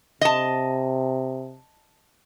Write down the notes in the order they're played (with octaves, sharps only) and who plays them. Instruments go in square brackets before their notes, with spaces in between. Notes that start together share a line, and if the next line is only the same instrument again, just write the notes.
[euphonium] C3 [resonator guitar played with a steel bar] D#5 A5